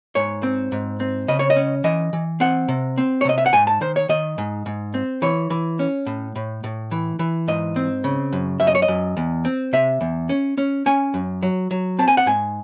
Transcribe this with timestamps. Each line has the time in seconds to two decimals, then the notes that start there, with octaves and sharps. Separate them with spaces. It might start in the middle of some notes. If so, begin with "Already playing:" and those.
0.15 G#2 C#5
0.43 C4
0.72 G#2
1.00 C4
1.28 C#3 D#5
1.39 C#5
1.50 D#5
1.56 C#4
1.84 E3 D#5
2.13 E3
2.40 C4 F#5
2.68 C3
2.98 C4
3.21 C#5
3.25 C3 D#5
3.38 E5
3.46 F#5
3.53 G#2 G#5
3.67 A5
3.81 D#3 C5
3.96 C#5
4.09 D#3 D#5
4.38 G#2
4.66 G#2
4.94 C4
5.22 E3 C#5
5.50 E3
5.79 C#4
6.06 A2
6.36 A2
6.64 A2
6.91 E3
7.19 E3
7.48 G#2 D#5
7.76 C4
8.04 C#3
8.32 F#2
8.60 F#2 E5
8.67 D#5
8.75 C#5
8.82 D#5
8.88 F#2
9.17 E2
9.45 C4
9.73 C3 E5
10.01 E2
10.29 C#4
10.58 C#4
10.86 C#4 G#5
11.14 F#2
11.43 F#3
11.71 F#3
11.99 C4 A5
12.08 G#5
12.17 F#5
12.26 G#2 G#5